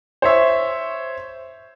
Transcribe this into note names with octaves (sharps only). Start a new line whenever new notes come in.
C5 C#5 E5